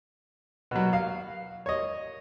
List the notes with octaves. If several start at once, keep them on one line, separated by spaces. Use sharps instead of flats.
B2 F#3
F5
C#5 D#5